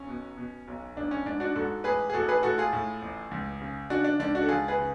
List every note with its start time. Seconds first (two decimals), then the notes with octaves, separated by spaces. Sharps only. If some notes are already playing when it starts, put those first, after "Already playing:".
Already playing: B1 C#4
0.09 B2
0.37 B2
0.68 B1
0.96 A1 D4
1.11 C#4
1.26 G#2 D4
1.40 D4 F#4
1.56 G#2 F#4 A4
1.84 A1 G#4 B4
2.10 G#4
2.13 A1 F#4 A4
2.29 G#4 B4
2.43 A2 F#4 A4
2.58 F4 G#4
2.73 A2
3.02 A1
3.31 C#2
3.62 C#3
3.90 C#3 D4 F#4
4.05 D4
4.19 C#2 D4
4.35 D4 F#4
4.42 A4
4.49 C#2 F4 G#4
4.68 G#4 B4
4.79 C#3